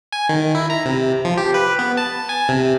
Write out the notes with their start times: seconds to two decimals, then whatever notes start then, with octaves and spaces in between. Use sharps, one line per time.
0.12 G#5
0.29 D#3
0.55 E4
0.70 A#5
0.85 C3
1.25 F3
1.38 G4
1.54 B4
1.79 B3
1.97 A5
2.29 G#5
2.49 C3